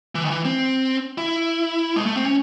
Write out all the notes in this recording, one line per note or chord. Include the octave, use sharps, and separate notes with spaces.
E3
D#3
E3
C4
E4
G#3
A3
C4
C#4